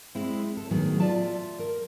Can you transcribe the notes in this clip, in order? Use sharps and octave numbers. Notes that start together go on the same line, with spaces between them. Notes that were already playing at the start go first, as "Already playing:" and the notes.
G#3 C4 E4
A4
A2 D#3 F#3 B3 G#4
F4 D5 E5 A5
A#4